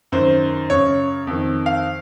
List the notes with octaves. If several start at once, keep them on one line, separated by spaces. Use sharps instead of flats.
F#2 D#3 C5
F#2 C#3 C#5
F2 D#3
F5